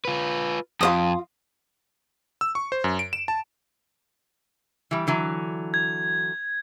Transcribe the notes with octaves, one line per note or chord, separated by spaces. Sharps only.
F4 B4
F2 F4 C5 D#6
E6
C#6
C5
F#2
D7
E7
A5
E3 G3
D3 E3 F#3
G#6